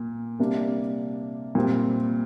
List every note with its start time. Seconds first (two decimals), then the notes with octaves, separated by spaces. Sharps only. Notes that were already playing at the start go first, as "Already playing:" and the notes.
Already playing: A#2
0.39 C3 G3 A#3 D4
1.55 A#2 G3 C4